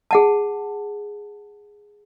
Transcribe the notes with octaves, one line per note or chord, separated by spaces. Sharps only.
G#4 F#5 A5